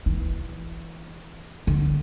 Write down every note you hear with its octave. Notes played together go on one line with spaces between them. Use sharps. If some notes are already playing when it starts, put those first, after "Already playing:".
E3
D3